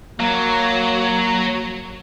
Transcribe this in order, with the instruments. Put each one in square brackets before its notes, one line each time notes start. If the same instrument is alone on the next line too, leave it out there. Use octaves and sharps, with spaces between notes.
[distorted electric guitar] F#3 [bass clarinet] A#3